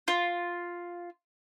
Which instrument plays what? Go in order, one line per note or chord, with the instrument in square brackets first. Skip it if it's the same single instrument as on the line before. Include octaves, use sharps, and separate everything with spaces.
[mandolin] F4